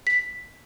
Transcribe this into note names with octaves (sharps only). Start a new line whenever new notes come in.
B6